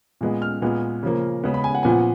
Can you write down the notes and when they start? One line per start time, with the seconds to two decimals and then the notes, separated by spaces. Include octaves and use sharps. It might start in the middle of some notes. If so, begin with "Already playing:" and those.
0.21 A#2 G#3 B3
0.42 F6
0.62 A#2 G#3 B3
1.03 C#3 F3 A#3
1.44 C#3 G#3 B3
1.54 B5
1.64 G#5
1.75 F#5
1.83 A#2 F3 B3 G#5
1.92 F#5